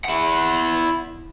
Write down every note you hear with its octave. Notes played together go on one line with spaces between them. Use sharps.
E4 F#5